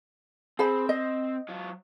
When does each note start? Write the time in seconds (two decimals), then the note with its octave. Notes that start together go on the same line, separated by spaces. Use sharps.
0.59 C4 G#4 C5 B5
0.89 D#5
1.49 F#3 F4